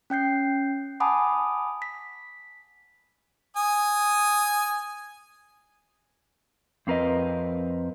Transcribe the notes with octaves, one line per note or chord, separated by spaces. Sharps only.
C#4 G5 G6 C7
F#5 G#5 A5 B5 D6 D#6
B6
G#5 D#6
F2 C4 A#4 B4 D#5